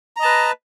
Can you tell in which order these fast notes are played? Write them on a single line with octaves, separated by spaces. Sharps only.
A#5 D#5 A5 B4